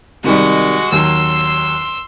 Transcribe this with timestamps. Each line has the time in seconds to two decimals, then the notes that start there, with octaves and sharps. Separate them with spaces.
0.24 C3 D#3 G3 G#3 F#4
0.92 D#2 F#3 C6 E6